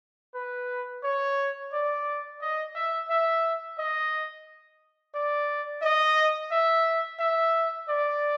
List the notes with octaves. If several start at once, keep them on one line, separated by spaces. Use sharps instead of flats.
B4
C#5
D5
D#5
E5
E5
D#5
D5
D#5
E5
E5
D5